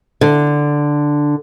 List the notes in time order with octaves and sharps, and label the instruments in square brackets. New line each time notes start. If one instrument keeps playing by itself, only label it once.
[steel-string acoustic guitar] D3